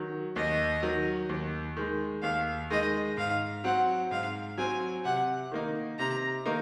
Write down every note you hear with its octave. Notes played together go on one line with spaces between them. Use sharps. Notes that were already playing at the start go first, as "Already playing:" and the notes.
Already playing: D#3 F#3
D#2 D#5
D#3 F#3
D#2
D#3 G#3
D#2 F5
D#3 G#3 D#5
G#2 F5
F#3 C4 F#5
G#2 F5
F#3 C4 G#5
C3 F#5
D#3 A#3 D#4
C3 A#5
D#3 A#3 D#4